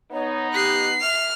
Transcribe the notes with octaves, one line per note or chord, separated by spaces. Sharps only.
B3 D#4 C#5
G4 F#6 C7
E5 F6